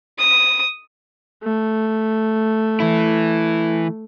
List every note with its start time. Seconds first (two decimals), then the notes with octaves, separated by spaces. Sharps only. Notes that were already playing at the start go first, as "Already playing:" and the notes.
0.18 D#6
1.43 A3
2.80 E3 E4